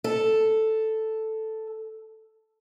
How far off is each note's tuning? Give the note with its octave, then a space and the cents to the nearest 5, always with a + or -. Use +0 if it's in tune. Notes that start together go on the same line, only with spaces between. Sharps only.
A4 +0